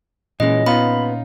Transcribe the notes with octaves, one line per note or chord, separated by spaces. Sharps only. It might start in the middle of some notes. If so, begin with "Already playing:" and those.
A#2 E3 G#3 C#4 D#5
B3 D#4 F4 B5